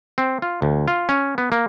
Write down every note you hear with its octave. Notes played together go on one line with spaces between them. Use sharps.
C4
F4
D2
F4
C#4
B3
A#3